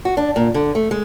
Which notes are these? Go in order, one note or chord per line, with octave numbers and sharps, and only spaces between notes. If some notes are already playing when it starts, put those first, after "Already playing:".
F#4
D4
A#2
D3
A3
G#3